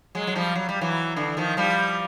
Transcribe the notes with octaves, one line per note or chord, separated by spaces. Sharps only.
F#3 G#3
F#3
F3 G3
F#3
G3
E3 F#3
D3 E3
D#3 F3
F3 G3